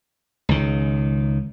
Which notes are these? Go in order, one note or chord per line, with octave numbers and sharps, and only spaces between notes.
C#2 D#3